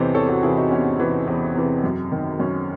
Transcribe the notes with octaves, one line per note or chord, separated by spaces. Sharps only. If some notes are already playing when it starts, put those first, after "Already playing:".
Already playing: E2 C3 E3 A4 C5 C#5 D#5
E2 A4 C#5
F#4 A4
C3 E3 E4 G#4
D#4 F#4
E2 C#4
C3 E3 C#4
E2 C4
C3 E3
F#2
D#3
F#2 C#4